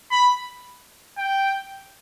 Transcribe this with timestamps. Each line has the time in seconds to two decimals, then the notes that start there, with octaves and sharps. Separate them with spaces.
0.11 B5
1.18 G5